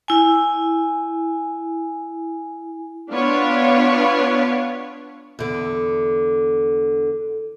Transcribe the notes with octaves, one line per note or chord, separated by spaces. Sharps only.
E4 G#5
B3 D4 F4 B4 C#5 F5
E2 D3